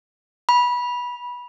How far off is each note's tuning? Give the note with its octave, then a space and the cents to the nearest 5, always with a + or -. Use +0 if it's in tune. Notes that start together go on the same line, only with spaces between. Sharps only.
B5 -20